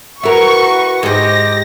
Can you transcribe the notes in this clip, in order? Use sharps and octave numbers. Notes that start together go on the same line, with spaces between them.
E4 F#4 A#4 B4 C#6
G#2 G4 G#4 A#6